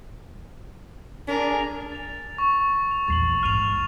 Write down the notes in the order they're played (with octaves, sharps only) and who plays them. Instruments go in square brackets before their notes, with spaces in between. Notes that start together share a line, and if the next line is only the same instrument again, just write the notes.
[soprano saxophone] D4 [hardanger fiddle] G#4 A#4
[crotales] A6 F7
C#6
F7
[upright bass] A#1 E2 [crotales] A6 C7 F#7
[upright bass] A#1 G#2 [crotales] F6 D#7 F7
[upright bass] E1